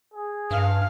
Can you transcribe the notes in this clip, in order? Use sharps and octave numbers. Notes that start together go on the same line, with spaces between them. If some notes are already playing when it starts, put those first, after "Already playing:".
G#4
G2 F5